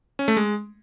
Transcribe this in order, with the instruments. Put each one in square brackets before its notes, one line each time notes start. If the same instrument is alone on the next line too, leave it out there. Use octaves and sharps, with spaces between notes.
[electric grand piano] C#4
A3
G#3